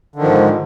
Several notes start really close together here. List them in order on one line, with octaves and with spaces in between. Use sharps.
D3 D#3 F3 G#2